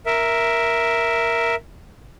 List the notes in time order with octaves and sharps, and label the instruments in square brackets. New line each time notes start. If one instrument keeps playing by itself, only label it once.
[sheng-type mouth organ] A#4 E5